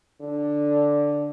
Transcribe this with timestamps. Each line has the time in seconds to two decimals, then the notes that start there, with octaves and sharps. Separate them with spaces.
0.21 D3